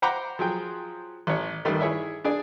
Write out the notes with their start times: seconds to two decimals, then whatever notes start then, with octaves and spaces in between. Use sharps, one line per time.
0.02 C5 F#5 G5 A#5 B5 D6
0.39 F3 F#3 G#4 G5
1.27 A1 C#5
1.65 A1 G2 D#3 G3 A3
1.80 E4 G#4 C#5 E5
2.24 D4 G#4 D5